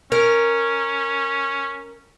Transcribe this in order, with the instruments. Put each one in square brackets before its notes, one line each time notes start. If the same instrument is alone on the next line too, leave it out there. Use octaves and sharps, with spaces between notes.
[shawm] C#4 [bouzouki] A#4